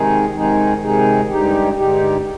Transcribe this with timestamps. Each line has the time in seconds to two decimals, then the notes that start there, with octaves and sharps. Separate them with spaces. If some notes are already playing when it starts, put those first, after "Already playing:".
Already playing: C3 D#3 G#3 D#4 G#4
0.35 C3 D#3 G#3 D#4 G#4
0.83 C3 D#3 G#3 D#4 G#4
1.31 G2 D3 G#3 D#4 G4
1.79 G2 D3 G#3 D#4 G4